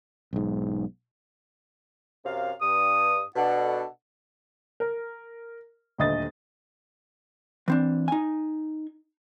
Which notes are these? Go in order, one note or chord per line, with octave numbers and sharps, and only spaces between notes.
B1 G#2
F#2 C3 F5
G2 D#6
B2 D4 A4 F#5
A#4
D#1 D2 D#5 D#6 A6
E3 C4 D4
D#4 G#5